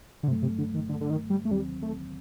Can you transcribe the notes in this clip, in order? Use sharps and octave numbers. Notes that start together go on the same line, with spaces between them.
D3
G2 C3 F#3 A3
C3
D3
D#3
D3
D3
D#3
G3
A3
D#2 D#3 F#3 G3 C4
A3